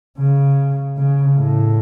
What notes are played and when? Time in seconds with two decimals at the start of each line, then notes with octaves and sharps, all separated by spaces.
0.18 C#3
0.97 C#3
1.38 A2